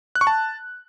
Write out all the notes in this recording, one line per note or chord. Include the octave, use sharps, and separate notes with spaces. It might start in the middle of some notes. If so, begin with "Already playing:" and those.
F#6
C#6
A5